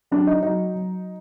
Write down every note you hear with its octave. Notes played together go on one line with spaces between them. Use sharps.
F#3 D4
D#4
F#3 D#4
F#3